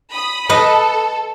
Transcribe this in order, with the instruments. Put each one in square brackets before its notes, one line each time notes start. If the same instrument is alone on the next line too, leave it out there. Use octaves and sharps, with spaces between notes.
[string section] B5 D#6
[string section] A4 [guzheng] B4 D#5